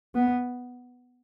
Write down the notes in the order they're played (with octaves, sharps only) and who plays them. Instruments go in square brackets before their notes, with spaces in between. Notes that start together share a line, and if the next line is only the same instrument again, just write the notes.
[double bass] B3